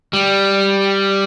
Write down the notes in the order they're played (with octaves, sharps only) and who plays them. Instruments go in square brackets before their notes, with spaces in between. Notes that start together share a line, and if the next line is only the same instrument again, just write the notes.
[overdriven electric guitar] G3